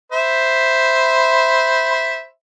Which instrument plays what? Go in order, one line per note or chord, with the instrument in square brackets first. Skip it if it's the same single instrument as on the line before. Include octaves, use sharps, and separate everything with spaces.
[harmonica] C5 E5 B5